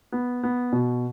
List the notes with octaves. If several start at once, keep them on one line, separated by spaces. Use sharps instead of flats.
B3
B3
B2